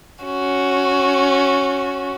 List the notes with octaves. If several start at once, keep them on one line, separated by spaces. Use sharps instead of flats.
C#4 F#4